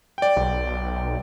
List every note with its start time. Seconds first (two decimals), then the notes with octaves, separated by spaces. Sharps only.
0.18 D5 G5
0.37 B1